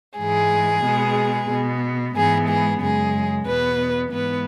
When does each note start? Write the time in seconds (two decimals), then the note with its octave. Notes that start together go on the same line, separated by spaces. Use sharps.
0.18 G#2 E3 G#3 G#4
0.83 B2 G#3 B3
1.49 B2 B3
2.15 G#2 E3 G#3 B3 G#4
2.48 G#4
2.81 F#2 C#3 G#3 G#4
3.46 E2 B2 B3 B4
4.12 G#2 E3 B3 B4